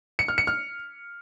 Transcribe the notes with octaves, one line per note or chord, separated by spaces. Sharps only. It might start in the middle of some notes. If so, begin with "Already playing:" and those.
C#7
F6
C#7
F6